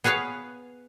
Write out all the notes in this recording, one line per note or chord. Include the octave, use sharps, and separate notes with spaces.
B3 G#4 B4 C#5 F5